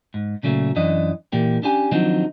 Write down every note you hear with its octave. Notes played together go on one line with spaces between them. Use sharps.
G#2
A#2 C#3 F#3 A3
F#2 E3 D4 D#5
A#2 E3 A#3 G4
C#4 D4 G4 G#5
D#3 F3 F#3 C4 D4 D#4